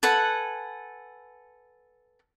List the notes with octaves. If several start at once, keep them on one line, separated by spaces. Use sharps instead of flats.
A4 B4 F#5 G#5